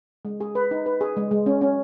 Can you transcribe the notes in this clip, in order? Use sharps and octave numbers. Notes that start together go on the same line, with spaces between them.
G#3
G#4
B4
D#4
B4
G#4
G#3
G#3
C#4
C#4